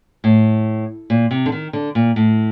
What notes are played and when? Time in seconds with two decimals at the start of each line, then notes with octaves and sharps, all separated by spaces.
0.24 A2
1.10 A#2
1.31 C3
1.46 D3
1.52 D#3
1.73 D3
1.95 A#2
2.16 A2